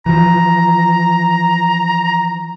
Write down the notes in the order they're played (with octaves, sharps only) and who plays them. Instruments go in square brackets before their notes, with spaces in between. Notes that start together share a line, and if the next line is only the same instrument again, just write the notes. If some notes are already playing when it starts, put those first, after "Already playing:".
[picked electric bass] E3 F3 [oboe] A#5